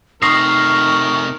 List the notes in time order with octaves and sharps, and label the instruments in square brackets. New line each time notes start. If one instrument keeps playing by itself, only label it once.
[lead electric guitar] C3 A3 [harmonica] D#3 A#4 [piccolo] C#6 [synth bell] D#6 A#6 C7